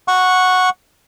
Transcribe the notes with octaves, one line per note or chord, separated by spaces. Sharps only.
F#5 C#6